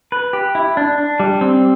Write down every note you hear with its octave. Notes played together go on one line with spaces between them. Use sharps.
B4
G4
E4
D4
D4
G3
C4